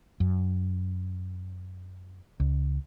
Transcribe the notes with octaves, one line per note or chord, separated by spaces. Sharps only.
F#2
C#2